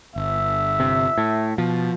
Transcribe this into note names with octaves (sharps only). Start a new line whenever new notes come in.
G1 E5
C3
A2
B2 F3